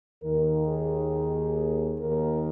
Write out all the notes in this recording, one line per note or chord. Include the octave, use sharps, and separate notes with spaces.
D#2 D#3 A#4
G#4
D#2 D#3 A#4